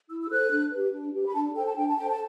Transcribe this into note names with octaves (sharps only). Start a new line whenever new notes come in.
E4 E6
E6
A4 C5 F#6
D4
G4 B4
D4
G4 B4
B5
D4 A5
A4 C5 G5
A5
D4 G5
A5
A4 C5 G5
A5